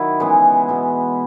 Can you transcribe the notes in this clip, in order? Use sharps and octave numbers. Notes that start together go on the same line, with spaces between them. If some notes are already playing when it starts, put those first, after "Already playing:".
Already playing: D#3 F#3 E4
C#3 E3 G#3 B3
B2 G#3 B3